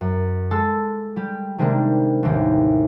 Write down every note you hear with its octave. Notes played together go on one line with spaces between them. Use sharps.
F#2
G#3 A4 E6 A6
G3 G4
C3 D#3 G3 G#3 A#3 D4
A1 D#2 D#3